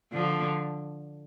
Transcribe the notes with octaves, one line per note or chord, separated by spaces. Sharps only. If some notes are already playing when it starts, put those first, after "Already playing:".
D3 F3